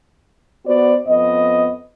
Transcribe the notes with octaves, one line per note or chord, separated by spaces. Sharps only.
B3 F#4 C5 D5
F2 B3 D#5